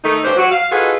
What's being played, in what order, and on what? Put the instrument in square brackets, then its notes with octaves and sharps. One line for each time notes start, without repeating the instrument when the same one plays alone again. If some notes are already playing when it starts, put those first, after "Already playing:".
[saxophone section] D#3 A3 D#4
G2 C#4 D4 C5
F#3 F#4
F5
D#4 F4 F#4 G#4 A4 B4